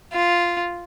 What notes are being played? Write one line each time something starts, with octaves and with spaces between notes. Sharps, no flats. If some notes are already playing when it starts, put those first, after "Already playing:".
F4